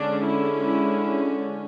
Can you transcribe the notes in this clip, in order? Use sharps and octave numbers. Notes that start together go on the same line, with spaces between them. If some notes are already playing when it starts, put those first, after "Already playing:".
Already playing: D3 G#3 C#4 D4
E4
E4